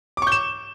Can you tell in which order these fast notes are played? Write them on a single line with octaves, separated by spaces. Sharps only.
D6 C#6 G6 E7